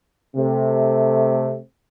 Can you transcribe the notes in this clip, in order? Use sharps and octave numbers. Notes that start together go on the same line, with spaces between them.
C3 A3